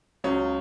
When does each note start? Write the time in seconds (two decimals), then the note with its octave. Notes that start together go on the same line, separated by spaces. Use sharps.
0.24 C#2 C#3 F#3 C#4